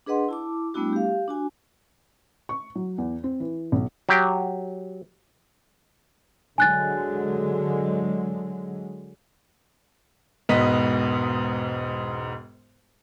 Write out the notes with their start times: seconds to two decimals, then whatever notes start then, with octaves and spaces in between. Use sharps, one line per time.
0.06 D4 G#4 B4 D#5 F#5 C6
0.29 E4 A5 D6
0.74 G3 A3 B3 D4 E4 F#4
0.93 G4 F5
1.28 D4 F#4 G#5
2.49 C#6
2.75 F#3
2.98 E2
3.24 C4
3.40 E3
3.72 B1
4.09 F#3 G4
6.58 D3 F#3 G#3 G#5 F#6 A6
10.49 E1 G#2 B3 D#5 B6